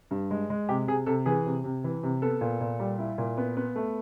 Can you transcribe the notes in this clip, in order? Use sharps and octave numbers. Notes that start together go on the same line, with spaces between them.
G2
G#3
G#3
C3 G4
C3 G#4
C3 A4
E3 G#4
C3
C3
E3
C3
B3 A4
A#2
A#2
G3
E4
A#2
B3
B3
A3